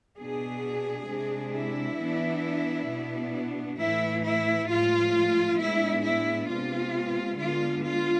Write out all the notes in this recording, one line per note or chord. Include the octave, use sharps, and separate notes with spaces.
B2 B3 D4 G#4
C3 G#3 D4
E4
E3 B3 D4
B2 B3 D4
A2 E3 A3 E4
E4
A2 F3 G#3 F4
A2 G#3 B3 D4 E4
E4
C3 G#3 B3 F4
D3 G#3 B3 F4
F4